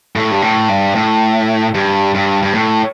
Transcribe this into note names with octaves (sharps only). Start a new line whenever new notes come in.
A2
G2
A2
G2
A2
G2
G2
G2
A2